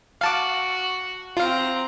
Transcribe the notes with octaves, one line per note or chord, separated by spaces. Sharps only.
F#4 F5 A5 D6
C4 F4 F5 A#5